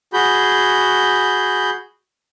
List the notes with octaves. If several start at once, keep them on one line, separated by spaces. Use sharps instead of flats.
F#4 G#4 B5 G6